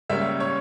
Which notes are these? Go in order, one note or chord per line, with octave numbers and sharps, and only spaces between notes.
C#2 C#3 G3 A#3 C#4 E5
C#5